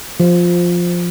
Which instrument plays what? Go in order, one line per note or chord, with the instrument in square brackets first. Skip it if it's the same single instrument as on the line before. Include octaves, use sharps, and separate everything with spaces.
[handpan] F3